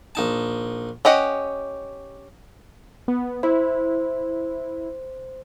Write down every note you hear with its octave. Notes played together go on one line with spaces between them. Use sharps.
A#1 D#4 A5
C#4 G4 D#5 F#5
B3
E4 C5